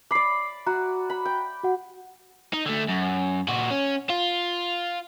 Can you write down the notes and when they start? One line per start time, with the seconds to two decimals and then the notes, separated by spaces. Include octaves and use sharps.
0.11 D5 B5 D6 C7
0.67 F#4 A#5
1.10 B5
1.25 G5
1.63 F#4 F#5
2.54 D#4
2.66 D3 A3
2.89 F#2
3.48 A#2 F#4
3.70 C#4
4.10 F4